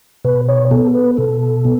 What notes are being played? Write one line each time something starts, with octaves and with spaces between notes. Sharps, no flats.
B2 B4
C#5
B3 A4
B4
B2 A4
B3